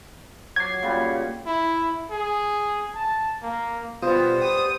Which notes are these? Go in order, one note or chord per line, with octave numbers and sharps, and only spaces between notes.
F#3 D6 G#6 C7
A#2 C#3 G3
E4
G#4
A5
A#3
B2 G3 B3 F4 C5 D#6
G4 D#6